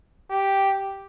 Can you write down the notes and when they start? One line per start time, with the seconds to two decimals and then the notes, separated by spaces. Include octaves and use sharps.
0.31 G4